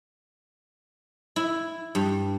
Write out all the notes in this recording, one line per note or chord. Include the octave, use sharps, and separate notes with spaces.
E4
G2